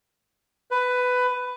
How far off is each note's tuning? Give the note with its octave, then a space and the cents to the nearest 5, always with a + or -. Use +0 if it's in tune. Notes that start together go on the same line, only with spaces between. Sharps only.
B4 +15